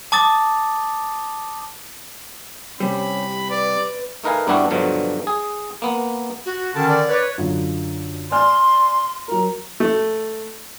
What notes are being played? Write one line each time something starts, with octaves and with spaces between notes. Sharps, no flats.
A5 D6 D#6 A6
C3 G3 C#4 B5
B4 D5
A3 D#4 A#4 B4 F5 G#5
G2 G3 B3 D4 E4 F#4
G2 B2 D3 F3 F#3
G#4
A#3 B3
F#4
D3 D#3 C#4 A5
D5
B4 C#5
F#2 D3 F4
D5 G#5 C6 F6
F#3 A#4 A#5
A3